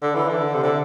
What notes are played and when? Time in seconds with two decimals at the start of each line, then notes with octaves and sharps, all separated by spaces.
0.03 D3
0.15 E3
0.29 D3
0.54 C3
0.63 D3